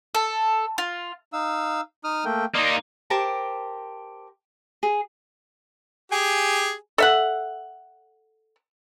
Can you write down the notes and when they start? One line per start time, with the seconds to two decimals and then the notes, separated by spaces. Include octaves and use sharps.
0.15 A4
0.78 F4
1.33 D#4 F5 E6
2.04 D#4 D#6 F6
2.25 A3 A#3 G5
2.55 A#3 D#4 D5 D#5 C6
3.10 G4 A#4 C5 A5
4.83 G#4
6.12 G4 G#4 G#5
6.98 A4 E5 F#5